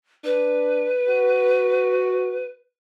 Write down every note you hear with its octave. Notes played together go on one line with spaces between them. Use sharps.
D4 B4
F#4